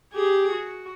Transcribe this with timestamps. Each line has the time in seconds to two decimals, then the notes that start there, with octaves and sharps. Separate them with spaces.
0.14 G4 G#4
0.51 F#4